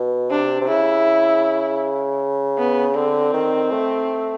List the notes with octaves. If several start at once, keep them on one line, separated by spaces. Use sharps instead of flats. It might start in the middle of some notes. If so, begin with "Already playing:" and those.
Already playing: B2
C3 D4
C3
C#3 E4
B3
D3 C4
D#3
A3